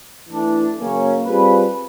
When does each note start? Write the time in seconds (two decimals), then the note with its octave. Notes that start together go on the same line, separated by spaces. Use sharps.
0.28 E3 A3 D4
0.77 C#3 F#3 A#3 C#4
1.25 G3 C4 F4 G#4 B4